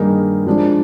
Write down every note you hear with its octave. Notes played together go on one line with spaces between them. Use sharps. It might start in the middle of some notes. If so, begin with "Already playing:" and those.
Already playing: G2 D#3 A#3 D#4 G#4
F3 G#3 D4